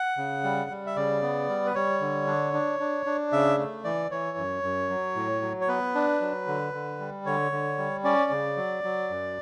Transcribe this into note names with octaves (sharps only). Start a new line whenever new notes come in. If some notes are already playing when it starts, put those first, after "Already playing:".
Already playing: F#5
C#3
G3
G3
E5
C#3 D5
B3
G3
B4
G3 C#5
D3
D4
D4
D4
D4
C#3 E5
A3
E3 D5
E3 C#5
F#2
F#2
F#3
A2
F#3
C#5
B3 B4
D4
F#3
D3
D3
G3
D3 C#5
D3
G3
C#4 D5
C#3
F#3
F#3
F#2